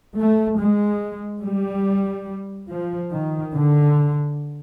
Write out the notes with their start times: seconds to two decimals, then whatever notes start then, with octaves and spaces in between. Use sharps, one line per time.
0.17 A3
0.58 G#3
1.42 G3
2.70 F3
3.12 D#3
3.54 D3